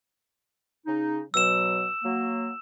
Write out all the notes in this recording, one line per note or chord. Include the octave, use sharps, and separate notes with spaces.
C#3 D#4
B2 F#3 E6 E7
F#3 A#3